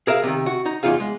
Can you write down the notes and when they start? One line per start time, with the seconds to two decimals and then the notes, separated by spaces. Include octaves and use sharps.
0.07 G#4 A#4 E5 F5
0.23 C3 D#3
0.46 F#4
0.66 D#4
0.83 E2 D#4 F4 G#4 F5
1.00 G#3